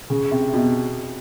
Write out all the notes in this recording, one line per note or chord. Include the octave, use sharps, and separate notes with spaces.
C#3
C3
B2